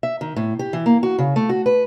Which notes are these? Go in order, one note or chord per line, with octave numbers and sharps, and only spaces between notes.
E5
D#3
A2
G4
E3
A#3
F#4
C#3
A3
F#4
B4